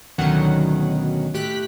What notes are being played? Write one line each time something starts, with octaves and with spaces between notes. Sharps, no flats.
D2 B2 D#3 F#3 C#4 F#5
A2 G4 F#6 B6